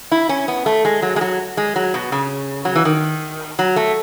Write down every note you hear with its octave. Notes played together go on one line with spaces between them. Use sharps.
E4
C#4
B3
A3
G#3
F#3
G#3
F#3
G#3
F#3
B2
C#3
F#3
E3
D#3
F#3
A3